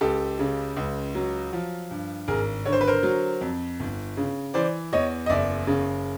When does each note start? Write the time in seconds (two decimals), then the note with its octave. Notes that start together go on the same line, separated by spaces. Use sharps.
0.01 C#2 G4 A4
0.39 C#3
0.77 C#2
1.15 F#3
1.53 F3
1.91 G2
2.28 G#1 G#4 A#4
2.65 D3 C#5
2.72 C5
2.81 B4
2.87 A#4 C5
3.03 F#3
3.41 F2
3.80 G1
4.17 C#3
4.54 E3 C5 D5
4.93 E2 C#5 D#5
5.26 D#5
5.30 F#1 D5 E5
5.67 C#3